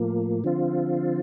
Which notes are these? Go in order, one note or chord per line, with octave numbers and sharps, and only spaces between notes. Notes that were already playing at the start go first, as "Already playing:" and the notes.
Already playing: A2 F3 A#3
D3 F3 C4 F4